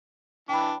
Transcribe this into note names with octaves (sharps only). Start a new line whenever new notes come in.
E3 D4 G5 B5